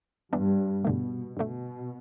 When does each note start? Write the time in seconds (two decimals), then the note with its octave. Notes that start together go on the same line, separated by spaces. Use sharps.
0.33 G2 E3 B3 D4
0.85 G2 B2 D3 A3
1.37 G2 B2 D3 A3